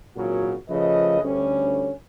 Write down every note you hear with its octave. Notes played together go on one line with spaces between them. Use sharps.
G#1 A#2 C#3 F#3 F#4
C#3 F3 A3 B4 D#5
D2 G3 C#4